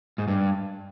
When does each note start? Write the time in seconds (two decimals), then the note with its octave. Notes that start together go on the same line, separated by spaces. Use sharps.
0.18 G#2
0.28 G2